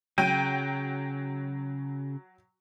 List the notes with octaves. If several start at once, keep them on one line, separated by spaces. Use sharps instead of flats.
C#3 F#3 G5 D#7